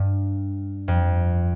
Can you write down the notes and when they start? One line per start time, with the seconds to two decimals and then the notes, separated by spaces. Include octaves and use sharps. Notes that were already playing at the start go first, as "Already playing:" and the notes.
Already playing: G2
0.88 F2